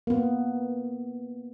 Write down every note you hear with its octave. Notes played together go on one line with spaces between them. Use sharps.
A#3 B3